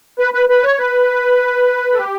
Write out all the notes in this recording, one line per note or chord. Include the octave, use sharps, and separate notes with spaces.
B4
B4
B4
C#5
B4
A4
G4